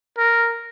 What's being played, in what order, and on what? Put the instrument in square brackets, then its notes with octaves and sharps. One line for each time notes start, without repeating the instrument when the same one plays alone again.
[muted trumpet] A#4